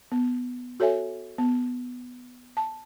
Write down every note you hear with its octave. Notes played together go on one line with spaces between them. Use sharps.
B3
F#4 A4 C#5 E5 G#5
B3
A5